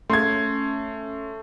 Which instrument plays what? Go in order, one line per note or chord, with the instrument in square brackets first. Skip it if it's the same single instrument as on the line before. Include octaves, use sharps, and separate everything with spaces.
[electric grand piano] A3 [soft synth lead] C#4 [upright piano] C6 G#6